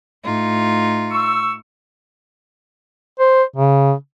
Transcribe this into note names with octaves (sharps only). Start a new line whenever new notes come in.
A2 D#4 F4
C#6 E6
C5
C#3